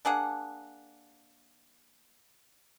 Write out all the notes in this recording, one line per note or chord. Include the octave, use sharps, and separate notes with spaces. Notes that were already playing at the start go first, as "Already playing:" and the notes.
A#3 D4 G#4 F#5